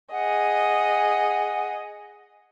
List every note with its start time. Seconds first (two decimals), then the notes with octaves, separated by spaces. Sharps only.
0.12 G#4 D#5 F#5